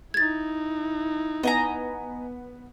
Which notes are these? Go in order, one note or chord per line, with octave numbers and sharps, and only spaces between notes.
D#4 E4 G#6 A6
B3 D#5 G#5 A#5